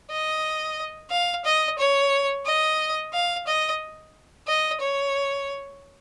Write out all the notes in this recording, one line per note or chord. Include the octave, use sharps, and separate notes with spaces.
D#5
F5
D#5
C#5
D#5
F5
D#5
D#5
C#5